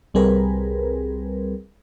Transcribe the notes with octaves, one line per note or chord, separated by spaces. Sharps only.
C2 G3 C4 G#4 A#4 B4